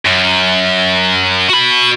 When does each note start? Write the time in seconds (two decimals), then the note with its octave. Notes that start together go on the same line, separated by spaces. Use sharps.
0.05 F#2
1.49 F#4 B5